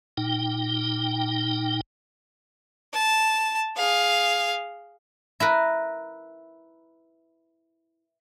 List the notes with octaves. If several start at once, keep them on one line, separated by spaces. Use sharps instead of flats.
A#2 D#4 G5
A5
G#4 F5
E4 A#4 B4